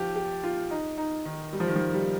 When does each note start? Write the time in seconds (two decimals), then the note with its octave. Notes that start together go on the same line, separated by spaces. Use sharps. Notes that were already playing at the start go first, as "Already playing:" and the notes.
Already playing: F3 G4
0.16 G4
0.43 F4
0.71 D#4
0.98 D#4
1.25 D#3
1.53 G3
1.60 F3
1.68 D#3
1.76 F3
1.94 G3